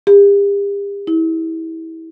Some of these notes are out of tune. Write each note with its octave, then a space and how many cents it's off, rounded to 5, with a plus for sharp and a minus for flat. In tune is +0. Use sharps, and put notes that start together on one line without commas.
G4 +40
E4 -25